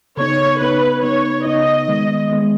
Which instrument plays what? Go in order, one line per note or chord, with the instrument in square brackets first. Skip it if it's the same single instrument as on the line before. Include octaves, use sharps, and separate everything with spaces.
[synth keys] C#3 B3 D#4 [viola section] C#5
[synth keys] C#3 B3 D#4 [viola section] B4
[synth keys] C#3 B3 D#4 [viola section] C#5
[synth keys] C#3 B3 D#4 [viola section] D#5
[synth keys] D#3 G#3 B3
D#3 G#3 B3